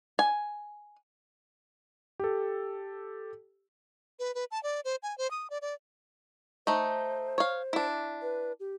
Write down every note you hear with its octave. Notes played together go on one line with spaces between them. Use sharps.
G#5
G4 A4
B4
B4
A5
D5
C5
G#5
C5
D#6
D5
D5
A3 D#4 C5
C#5 F5
D4 E4
B4
G4